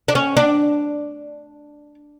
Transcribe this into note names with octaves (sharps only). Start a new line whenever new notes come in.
D4
C#4
D4